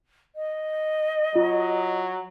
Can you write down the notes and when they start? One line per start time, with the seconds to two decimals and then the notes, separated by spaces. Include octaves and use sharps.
0.36 D#5
1.35 F#3 F4